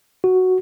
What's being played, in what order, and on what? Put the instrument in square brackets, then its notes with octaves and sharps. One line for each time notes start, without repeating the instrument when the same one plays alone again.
[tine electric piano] F#4